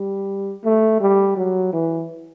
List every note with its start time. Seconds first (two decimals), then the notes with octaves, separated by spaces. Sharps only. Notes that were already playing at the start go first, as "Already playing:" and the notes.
Already playing: G3
0.64 A3
1.01 G3
1.37 F#3
1.73 E3